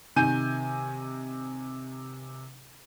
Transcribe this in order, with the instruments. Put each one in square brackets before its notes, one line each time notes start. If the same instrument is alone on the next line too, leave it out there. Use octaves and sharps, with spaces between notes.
[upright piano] C3 D#3 G#5 G6 D#7